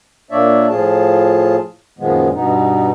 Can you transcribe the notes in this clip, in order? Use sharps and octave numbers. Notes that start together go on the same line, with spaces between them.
A#2 A#3 D4 C#5 D5 E5
A2 F3 F4 G#4 A5
F#2 A#2 D#3 F3 G#3 B3
G2 B2 B3 D#4